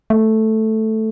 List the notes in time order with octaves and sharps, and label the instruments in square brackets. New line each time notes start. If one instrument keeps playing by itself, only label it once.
[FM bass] A3